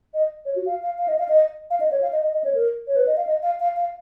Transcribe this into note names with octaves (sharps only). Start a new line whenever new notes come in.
D#5
C#5
F#4
F5
F5
F5
D#5
F5
D#5
F5
D#5
C#5
F5
D#5
D#5
D#5
C#5
A#4
C#5
B4
D#5
F5
D#5
F5
F5
F5